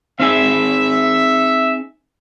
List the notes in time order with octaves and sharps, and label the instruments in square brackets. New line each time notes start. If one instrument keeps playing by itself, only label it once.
[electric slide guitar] C4 D#4 G#4 [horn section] E5